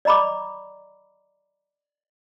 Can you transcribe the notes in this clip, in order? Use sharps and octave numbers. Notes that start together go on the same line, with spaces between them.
D5 D#5 A#5 B5 D6